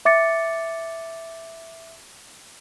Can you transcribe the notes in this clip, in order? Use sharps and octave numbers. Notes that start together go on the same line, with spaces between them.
E5 D6 A6 C#7